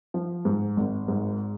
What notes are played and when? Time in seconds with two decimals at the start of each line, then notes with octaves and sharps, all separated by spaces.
0.14 F3
0.45 G#2
0.77 G#1
1.08 G#2